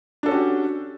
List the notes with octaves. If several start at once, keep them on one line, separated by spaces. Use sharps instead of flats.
C#4 D4 F#4 G4 A4